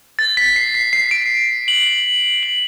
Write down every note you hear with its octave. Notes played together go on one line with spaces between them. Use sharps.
A6
B6
C7
C7
C7
D7
F#7
F#7